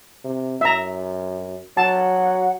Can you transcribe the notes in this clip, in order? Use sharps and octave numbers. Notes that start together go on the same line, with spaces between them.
C3
F#2 E5 A#5
F#3 F#5 A5